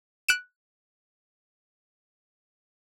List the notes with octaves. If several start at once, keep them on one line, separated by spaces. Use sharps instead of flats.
F#6 D7 E7